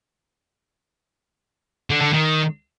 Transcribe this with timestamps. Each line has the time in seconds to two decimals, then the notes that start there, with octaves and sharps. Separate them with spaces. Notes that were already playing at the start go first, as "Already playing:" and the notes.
1.90 D3
2.02 D3
2.13 D#3